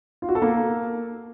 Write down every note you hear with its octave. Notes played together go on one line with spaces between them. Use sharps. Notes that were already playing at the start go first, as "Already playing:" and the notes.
F4
F#4
A4
A#3